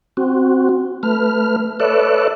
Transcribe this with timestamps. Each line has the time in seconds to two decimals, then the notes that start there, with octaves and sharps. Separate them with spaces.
0.17 C4 F#4
1.03 A3 B4 F6
1.80 A4 B4 C#5 D5 E5 F#6